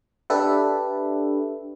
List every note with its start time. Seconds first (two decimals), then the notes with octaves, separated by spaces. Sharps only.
0.30 D4 G4 A4 B4 E5